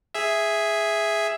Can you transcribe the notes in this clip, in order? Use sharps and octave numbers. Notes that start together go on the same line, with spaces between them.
G#4 E5